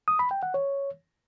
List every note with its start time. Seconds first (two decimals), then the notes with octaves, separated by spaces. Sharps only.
0.08 D#6
0.19 B5
0.31 G5
0.43 F#5
0.54 C#5